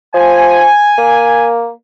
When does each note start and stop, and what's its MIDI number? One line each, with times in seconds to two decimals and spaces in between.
0.14 0.66 53
0.14 1.48 80
0.98 1.70 58